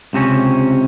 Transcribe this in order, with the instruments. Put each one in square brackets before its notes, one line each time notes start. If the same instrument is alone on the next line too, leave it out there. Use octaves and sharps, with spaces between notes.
[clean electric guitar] C#2 C3 C4 C#4